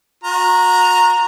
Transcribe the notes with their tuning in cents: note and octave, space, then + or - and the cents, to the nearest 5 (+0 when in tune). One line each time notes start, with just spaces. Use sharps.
F#4 -35 A#5 +0